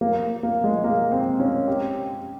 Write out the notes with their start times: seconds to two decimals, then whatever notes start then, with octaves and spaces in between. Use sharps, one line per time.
0.01 A#3
0.43 A#3
0.64 G#3
0.84 A#3
1.12 C4
1.40 C#4
1.68 G4